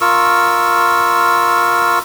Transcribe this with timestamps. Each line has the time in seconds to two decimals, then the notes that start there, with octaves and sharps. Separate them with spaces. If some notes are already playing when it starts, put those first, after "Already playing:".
0.01 F4 A#4 C#6 E6